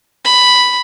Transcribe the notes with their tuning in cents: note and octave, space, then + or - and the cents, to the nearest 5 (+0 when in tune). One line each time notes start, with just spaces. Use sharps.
B5 +5